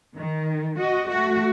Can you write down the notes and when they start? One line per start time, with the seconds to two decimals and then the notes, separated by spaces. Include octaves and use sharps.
0.17 D#3
0.79 F#4 D#5
1.09 A3 F#4